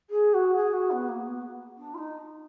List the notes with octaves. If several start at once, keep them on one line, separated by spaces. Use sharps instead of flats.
G#4
F#4
G#4
F#4
B3
A#3
B3
D4
F4
D#4